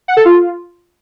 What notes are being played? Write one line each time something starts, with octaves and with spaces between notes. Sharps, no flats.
F#5
A4
F4